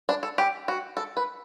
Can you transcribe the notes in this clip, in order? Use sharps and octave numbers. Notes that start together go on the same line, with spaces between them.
D4
A4
G4
F#4
A4
B4